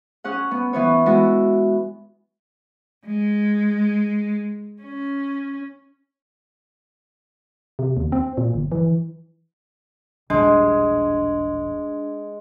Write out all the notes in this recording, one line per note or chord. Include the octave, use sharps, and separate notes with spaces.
C#4 G#4 F#5
B3
E3 B3 C#5
G#3 B3 E4 F#4
G#3
C#4
C3
D#2
C4
A#2
G1
E3
D#1 A1 G#3 D4